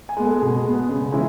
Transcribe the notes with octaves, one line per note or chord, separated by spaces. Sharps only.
G#5
G#3 B3
A4
B2 G#4
G#3 B3
C#3
E3 G#3 C#4 E4